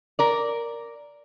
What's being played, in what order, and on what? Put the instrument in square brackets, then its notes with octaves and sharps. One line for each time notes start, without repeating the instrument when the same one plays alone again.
[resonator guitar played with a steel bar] A#4 D5